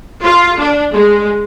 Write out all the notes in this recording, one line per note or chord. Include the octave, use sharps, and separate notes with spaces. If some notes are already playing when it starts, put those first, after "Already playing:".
F4
D4
G#3